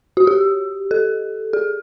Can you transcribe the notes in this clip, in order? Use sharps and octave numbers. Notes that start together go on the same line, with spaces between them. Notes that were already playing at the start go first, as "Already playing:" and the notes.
F#4
G4
A4
G#4